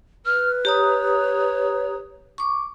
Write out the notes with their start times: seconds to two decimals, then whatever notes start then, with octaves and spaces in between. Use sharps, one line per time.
0.26 B4 F6
0.65 G4 C#5 A#5 D#6
2.38 C#6 D6